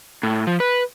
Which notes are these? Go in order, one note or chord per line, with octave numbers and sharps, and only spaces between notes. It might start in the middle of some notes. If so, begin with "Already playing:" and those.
A2
F3
B4